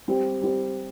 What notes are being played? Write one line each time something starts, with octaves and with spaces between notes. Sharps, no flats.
G3 C4 G4 C5
G3 C4 G4 C5